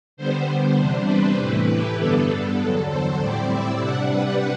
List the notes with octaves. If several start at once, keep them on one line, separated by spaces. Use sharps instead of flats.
D3 G3 B3 C5
C5
E2 C3 G3 D4
B4
A2 E3 A3 E4
G4
G2 D3 G3 B3 D4 A4
E2 D3 F#3 A4
C5
A2 G3 C4 E4 D5
E5
C3 G3 D4 F#5
B4